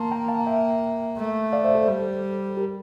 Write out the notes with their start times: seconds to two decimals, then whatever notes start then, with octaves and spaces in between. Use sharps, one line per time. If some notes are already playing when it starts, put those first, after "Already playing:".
Already playing: A#3 A5 C6
0.11 G5 A#5
0.28 F5 A5
0.47 E5 G5
1.17 A3
1.53 D5 F5
1.64 C5 E5
1.75 A4 C5
1.88 G3
2.57 G4 A#4